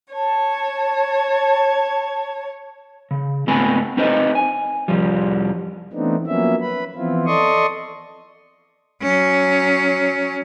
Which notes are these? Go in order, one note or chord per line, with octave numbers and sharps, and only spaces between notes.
C#5 A5
C#3
G#2 A3 B3 C4 G#5 B5
C4 D#4 B4 C5 D#5
G#5
C2 F2 F3 G3
E3 A3 B3 C4 D4 D#4
F3 F#3 A#3 B3 C#4 E5
B4 B5
E3 F3 B3 C4 E4 F4
A4 D5 D#5 C6 C#6 D#6
F#3 C#4